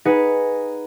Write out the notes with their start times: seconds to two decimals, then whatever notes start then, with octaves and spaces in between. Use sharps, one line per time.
0.05 D#4 G#4 B4 F#5